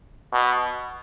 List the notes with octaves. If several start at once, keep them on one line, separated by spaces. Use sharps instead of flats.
B2